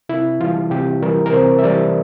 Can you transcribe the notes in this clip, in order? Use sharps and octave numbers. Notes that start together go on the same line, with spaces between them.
C3 E4
E3 G3 F4
C3 G4
E3 G3 A#4
A#4
C3 C5
E5
E3 G3 D5